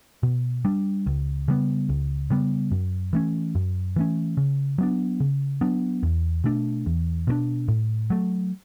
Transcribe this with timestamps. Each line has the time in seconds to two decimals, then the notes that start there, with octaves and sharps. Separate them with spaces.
0.23 B2
0.65 G3 D4
1.06 C#2
1.48 C#3 G3 B3
1.89 C#2
2.30 C#3 G3 B3
2.71 F#2
3.13 E3 A3 C#4
3.55 F#2
3.96 E3 A3 C#4
4.37 C#3
4.78 F#3 B3 D4
5.20 C#3
5.61 F#3 B3 D4
6.03 E2
6.44 B2 A3 D4
6.86 E2
7.27 B2 A3 D4
7.68 A2
8.10 F#3 A3